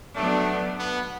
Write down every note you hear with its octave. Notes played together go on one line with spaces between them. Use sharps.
F#3 A3 B3 D4
B3